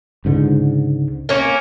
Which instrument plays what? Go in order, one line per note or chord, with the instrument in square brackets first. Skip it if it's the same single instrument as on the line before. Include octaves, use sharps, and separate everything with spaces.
[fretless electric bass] C#2 G#2 D3
[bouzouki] A#3 C#4 A#4